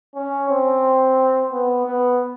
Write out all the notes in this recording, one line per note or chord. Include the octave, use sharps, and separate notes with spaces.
C#4
C4
B3
B3